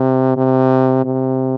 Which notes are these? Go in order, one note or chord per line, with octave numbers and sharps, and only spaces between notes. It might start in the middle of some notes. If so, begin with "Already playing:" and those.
Already playing: C3
C3
C3